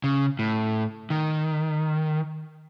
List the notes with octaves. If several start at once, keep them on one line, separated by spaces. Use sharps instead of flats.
C#3
A2
D#3